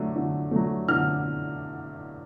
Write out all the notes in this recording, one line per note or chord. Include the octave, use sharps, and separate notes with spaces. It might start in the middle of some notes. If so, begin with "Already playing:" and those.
Already playing: D3 F#3 A3
D3
F#3 A3
D3 F6